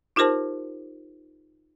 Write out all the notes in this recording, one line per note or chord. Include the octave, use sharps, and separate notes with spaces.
D#4 F4 G4 A#4 C5 A5